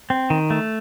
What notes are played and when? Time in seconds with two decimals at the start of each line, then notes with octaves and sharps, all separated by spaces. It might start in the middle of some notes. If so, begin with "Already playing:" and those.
0.10 C4
0.30 D#3
0.50 A3